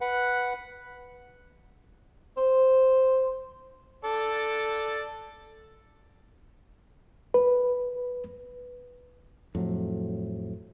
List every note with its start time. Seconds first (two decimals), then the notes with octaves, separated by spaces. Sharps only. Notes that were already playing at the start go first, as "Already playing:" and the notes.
0.01 B4 F#5
2.37 C5
4.04 A4 D5
7.34 B4
9.55 F2 A2 F#3